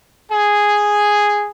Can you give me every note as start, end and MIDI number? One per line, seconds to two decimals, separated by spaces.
0.31 1.49 68